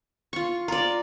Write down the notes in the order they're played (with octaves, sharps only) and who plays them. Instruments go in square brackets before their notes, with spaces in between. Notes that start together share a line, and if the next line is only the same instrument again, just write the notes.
[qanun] F4 C#6
[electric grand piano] F4 [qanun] A#4 D5